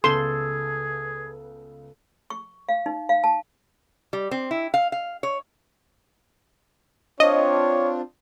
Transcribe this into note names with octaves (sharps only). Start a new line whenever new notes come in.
C#2 C#3 B3 G#4 A4 C6
C#6
F5
D#4
F5
A5
G3
C4
E4
F5
F5
C#5
C4 D4 F4 C#5 D#5